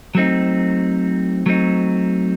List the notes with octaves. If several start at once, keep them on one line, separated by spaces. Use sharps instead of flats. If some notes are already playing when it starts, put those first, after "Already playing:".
F#3 A3 C4 D#4
F#3 A3 C4 D#4